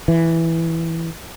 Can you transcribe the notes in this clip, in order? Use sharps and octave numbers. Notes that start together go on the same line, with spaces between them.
E3